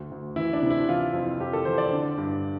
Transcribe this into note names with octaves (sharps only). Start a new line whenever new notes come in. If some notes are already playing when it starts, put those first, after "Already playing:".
Already playing: D2
D2
E3 E4
D4
C3
E4
E3 F4
F2
F2 G4
A4
E3 C5
D5
D3
G2